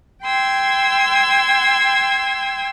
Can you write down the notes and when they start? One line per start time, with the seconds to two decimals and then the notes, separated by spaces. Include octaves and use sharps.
0.23 G5 C6 E6 G#6